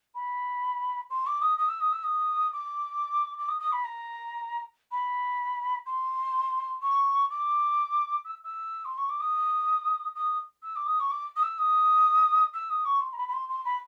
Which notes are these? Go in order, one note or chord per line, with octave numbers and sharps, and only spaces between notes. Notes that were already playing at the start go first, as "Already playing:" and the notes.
B5
C6
D6
D#6
D#6
E6
D#6
E6
D#6
D6
D6
D#6
D#6
B5
A#5
B5
C6
C#6
D6
E6
E6
C6
C#6
D6
D#6
D#6
E6
D6
D#6
C#6
D6
D#6
E6
D#6
E6
D#6
C#6
C6
A#5
B5
B5
C6
C6
B5